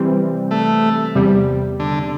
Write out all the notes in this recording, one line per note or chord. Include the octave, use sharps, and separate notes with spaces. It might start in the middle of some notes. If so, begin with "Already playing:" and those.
Already playing: C3 E3 G3 C4
A3
E2 C3 G3
D3